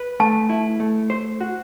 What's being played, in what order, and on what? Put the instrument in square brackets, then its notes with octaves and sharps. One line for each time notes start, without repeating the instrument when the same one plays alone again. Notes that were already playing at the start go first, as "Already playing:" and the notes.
Already playing: [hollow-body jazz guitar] B4
[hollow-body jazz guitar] A3 [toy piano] A5
[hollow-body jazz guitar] E4
A3
C5
F#4